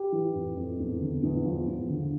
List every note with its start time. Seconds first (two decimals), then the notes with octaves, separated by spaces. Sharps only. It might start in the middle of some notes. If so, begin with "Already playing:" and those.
Already playing: G4
0.12 E3
0.35 F2
0.57 F2
0.80 E2
1.01 D3
1.23 E2
1.45 F3
1.68 E2
1.90 D3